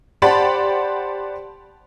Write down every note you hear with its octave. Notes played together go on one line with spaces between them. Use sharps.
G4 C5 D5 F#5 A5 B5